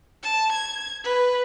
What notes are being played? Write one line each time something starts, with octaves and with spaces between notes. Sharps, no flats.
A5
G#6
B4